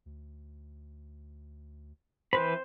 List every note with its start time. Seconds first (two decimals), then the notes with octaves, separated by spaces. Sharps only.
0.06 D2
2.33 E3 B4 C5 B5